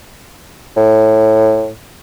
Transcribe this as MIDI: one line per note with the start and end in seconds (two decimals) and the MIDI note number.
0.76 1.71 45